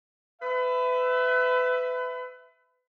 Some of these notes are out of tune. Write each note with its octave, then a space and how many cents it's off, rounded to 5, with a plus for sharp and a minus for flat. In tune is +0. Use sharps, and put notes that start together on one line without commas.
B4 +30 E5 +5